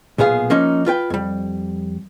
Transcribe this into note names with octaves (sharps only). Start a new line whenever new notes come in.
B1 A#2 B3 G#4 F5
F3 A#3 C#4 D#4
F4 B4 G5
F2 G3